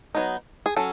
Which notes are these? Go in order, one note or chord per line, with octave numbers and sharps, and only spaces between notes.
F#3 B3 D#4
G#4
F#3 C#4 A4